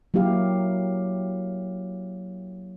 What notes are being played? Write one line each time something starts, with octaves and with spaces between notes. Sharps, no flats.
F#3 A#3 E4 G4 F5